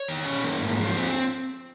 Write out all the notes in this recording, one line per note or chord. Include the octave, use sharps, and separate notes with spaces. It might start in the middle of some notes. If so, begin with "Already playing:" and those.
Already playing: C#5
D#3
C#4
A#3
G#2
F3
C4